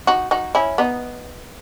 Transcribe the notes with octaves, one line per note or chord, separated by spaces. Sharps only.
D#4 F#4
D#4 F#4
C#4 E4
B3 D#4